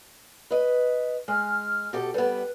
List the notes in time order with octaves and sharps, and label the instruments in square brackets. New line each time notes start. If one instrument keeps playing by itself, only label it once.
[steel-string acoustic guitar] B4 D#5
[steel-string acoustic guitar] G#3 [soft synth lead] F6
[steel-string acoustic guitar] B2 G4 A4
[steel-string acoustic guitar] G3 B3 [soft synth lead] B4